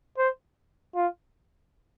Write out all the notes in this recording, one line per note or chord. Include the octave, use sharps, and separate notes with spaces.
C5
F4